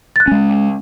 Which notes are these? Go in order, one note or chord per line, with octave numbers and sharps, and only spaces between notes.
F#6 A6
G#3 C#4